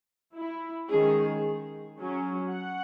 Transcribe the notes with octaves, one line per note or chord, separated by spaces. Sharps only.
E4
D#3 G#3 C#4 G#4
F#3 C#4
F#5